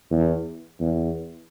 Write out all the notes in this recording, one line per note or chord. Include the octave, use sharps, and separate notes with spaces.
E2
E2